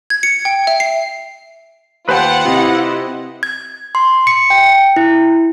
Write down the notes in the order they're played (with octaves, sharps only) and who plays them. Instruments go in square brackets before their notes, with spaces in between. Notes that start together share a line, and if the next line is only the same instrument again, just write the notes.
[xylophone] G#6
C#7
G5
E5
C7
[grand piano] D#2 [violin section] F4 F#5 [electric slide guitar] B4 C5 G5
[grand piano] C3 [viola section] E4 G4 D#5
[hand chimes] G#6
C6
C#7
G5
E4